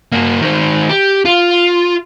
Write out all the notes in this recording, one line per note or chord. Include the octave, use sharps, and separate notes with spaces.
A#3 F#4
D#3 C5
G4
F4